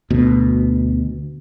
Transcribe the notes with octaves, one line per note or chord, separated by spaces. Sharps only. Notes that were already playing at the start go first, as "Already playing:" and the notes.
D2 B2